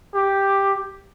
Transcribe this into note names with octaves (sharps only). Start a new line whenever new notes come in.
G4